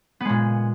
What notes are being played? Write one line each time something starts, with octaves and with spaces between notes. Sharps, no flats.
A#2 G#3 B3